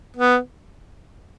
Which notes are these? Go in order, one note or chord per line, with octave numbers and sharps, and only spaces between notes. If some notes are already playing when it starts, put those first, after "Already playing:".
B3